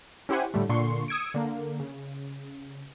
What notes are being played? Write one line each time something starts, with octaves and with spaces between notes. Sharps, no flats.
C#4 E4 G4 C5 F#5 G#5
A2 D3 G3 A3
A#2 D3 C6 C#6
D#6 E6 G#6 C#7 D7
D3 A#3
C#3